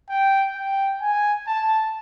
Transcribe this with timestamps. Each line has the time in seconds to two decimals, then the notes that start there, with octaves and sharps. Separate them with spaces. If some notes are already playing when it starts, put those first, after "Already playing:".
0.09 G5
0.55 G5
1.01 G#5
1.47 A5